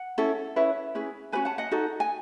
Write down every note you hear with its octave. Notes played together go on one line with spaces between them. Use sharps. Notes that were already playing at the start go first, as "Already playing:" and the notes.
Already playing: F#5
C#4 E4 A4
C#4 E4 B4
C#4 E4 G#4 B4
C#4 F#4 B4 G#5 B5
F#5 A5
D#5 F#5
D#4 F#4 A4
G#5